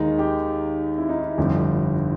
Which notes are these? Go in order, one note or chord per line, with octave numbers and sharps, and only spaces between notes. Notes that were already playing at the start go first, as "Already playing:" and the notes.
Already playing: D#2 D#3 G#3 D#4
G4
E4
D#4
E4
G1 F2 D3 G3